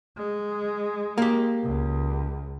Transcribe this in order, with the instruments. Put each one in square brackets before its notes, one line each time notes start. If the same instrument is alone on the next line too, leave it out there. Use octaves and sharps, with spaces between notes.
[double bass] G#3
[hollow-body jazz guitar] A#3 G4
[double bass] C#2